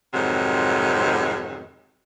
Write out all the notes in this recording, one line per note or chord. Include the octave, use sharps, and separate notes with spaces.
F2 G#2 C3 D#3 F#3